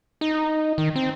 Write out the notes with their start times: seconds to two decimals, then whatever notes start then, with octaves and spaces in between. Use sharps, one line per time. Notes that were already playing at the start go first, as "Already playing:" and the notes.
0.21 D#4
0.78 D#3
0.96 C4